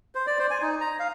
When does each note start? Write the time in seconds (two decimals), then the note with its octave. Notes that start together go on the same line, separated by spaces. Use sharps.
0.15 C5
0.27 D5
0.39 C5
0.51 G#5
0.62 D#4
0.81 A#5
1.00 F5